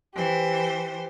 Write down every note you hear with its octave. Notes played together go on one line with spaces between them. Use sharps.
E3 G4 C5